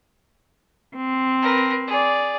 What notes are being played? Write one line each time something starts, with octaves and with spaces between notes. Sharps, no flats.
C4
A#4 B4
G#4 D5